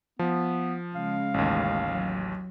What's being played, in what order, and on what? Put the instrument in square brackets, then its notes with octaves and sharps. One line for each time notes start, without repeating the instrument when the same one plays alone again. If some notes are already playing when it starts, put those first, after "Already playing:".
[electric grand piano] F3 [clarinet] B3
[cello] C#3 G#3 [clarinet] F5
[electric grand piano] A1 D#2
[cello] F#3